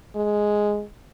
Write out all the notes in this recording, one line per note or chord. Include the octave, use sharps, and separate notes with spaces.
G#3